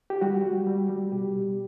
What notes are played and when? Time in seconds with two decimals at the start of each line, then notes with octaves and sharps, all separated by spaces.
0.10 G4
0.21 G3 F#4
0.44 G3
0.67 G3
0.89 G3
1.12 B2 G4
1.35 B2